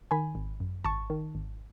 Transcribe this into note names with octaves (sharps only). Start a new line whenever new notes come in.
D#3 G#5 B5
G#1
F#2
G#1 A5 C#6
D#3
G#1